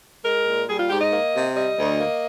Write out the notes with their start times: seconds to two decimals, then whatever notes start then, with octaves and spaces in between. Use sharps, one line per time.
0.24 G#3 A#4
0.46 A#2
0.68 G3 G#4
0.78 F4
0.90 G#2 G4
1.00 D#5
1.11 A#3
1.34 C3
1.55 G3 D#5
1.77 D2
1.99 A#3